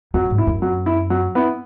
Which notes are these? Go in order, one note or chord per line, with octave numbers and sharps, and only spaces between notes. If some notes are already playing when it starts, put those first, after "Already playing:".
F#2 F#3
G#2
E4
F#2
F#3
E4
F#3
B3 E4